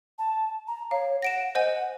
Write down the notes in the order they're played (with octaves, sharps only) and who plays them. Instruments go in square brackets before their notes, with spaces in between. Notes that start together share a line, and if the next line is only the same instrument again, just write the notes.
[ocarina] A5
A#5
[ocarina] C#5 [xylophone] F5
[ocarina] F#5 [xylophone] A#6 D7 E7
[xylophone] C5 D#5 G#5 [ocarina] F#5